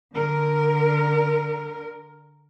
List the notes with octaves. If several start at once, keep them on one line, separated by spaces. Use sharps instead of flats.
D3 A#4